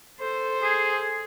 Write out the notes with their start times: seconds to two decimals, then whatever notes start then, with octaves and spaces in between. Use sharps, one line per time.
0.18 A4 C5
0.62 G#4